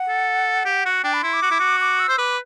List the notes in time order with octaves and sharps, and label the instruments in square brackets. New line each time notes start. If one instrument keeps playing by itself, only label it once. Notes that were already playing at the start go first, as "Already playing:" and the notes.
Already playing: [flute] F#5
[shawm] A4
G4
F#4
[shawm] D4 [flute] G5
[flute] B5
[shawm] E4 [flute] C6
[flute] D6
[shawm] F#4
E4
F#4
[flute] D6
E6
[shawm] C5
[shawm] B4 [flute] D6